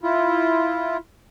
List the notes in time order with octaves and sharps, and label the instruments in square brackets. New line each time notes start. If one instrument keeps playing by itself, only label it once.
[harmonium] E4 F4